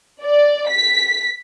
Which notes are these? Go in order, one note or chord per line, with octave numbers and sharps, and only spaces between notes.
D5
B6